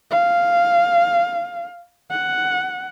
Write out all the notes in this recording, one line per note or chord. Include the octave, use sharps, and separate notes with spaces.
F5
F#5